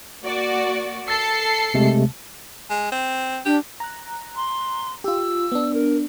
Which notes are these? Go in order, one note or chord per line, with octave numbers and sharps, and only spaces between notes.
A#3 F#4 D5
A4 E6 A6 C7 C#7
C3 G#3 A3
G#3
C4
D4 G4
A#5 F#6
C6
F4 G4 E6
B3 D4
A#4